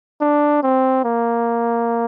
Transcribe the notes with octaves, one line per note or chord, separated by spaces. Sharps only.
D4
C4
A#3